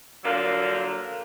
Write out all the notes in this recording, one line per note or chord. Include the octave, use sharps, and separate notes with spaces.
D3 F3 F#3 A#3 D4